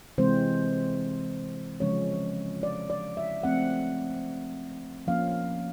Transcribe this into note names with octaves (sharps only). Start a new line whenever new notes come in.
C3 E3 G#3 C4 C5
C#3 F3 G#3 C#4 C#5
D5
D5
E5
F3 A3 C4 F#5
F3 A#3 C#4 F5